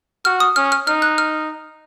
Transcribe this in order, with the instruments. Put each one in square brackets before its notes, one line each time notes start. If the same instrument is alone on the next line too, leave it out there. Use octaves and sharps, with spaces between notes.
[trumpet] F#4 [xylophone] F6
[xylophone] D#6
[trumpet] C#4 [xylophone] F6
[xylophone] F6
[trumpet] D#4 [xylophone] F6
[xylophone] F#6
F6